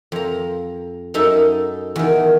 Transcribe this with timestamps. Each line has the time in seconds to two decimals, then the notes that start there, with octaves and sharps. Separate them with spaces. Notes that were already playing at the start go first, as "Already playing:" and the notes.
0.12 F2 A#5
1.14 F#2 D#4 A4 E5
1.96 E2 D#3